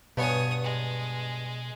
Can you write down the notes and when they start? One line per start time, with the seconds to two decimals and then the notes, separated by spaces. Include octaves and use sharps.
0.17 G2 B2 B3 C#5 G#5 D#6
0.63 G#3